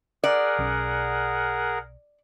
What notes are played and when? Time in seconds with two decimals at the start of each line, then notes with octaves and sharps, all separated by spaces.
0.24 G#4 A#4 D5 F#5
0.59 B1 C#4